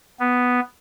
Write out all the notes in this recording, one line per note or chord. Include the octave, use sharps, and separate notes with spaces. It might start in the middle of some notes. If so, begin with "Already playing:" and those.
B3